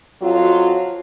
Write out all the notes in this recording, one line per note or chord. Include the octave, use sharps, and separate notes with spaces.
F2 F#3 F4